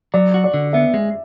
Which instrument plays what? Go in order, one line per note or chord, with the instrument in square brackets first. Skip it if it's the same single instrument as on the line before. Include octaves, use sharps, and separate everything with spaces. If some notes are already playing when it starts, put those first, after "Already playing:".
[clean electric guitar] F#3 [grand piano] D5
[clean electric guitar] F#4
[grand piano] D5
[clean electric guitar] D3
[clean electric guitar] B3 [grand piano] E5
[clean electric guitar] G#3